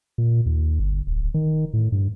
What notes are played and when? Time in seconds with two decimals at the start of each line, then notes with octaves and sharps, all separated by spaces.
0.18 A#2
0.46 D#2
0.79 G1
1.07 D1
1.34 D#3
1.74 A2
1.92 G2